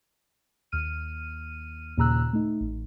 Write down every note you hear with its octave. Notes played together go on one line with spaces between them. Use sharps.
D#2 F6 D#7
D#2 A#2 C#3 A#5 E6 F#6
A3 D#4
A1